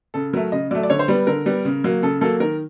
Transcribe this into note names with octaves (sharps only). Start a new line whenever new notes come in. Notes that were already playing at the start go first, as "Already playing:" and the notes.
C#3 A4
F#3 A3 A#4
C#3 D#5
F#3 A3 D5
D5
D3 C#5
C5
G3 B3 B4
D3 A#4
G3 B3
C#3
F#3 A#3
C#3 A4
F#3 A#3 A4
D#3 A#4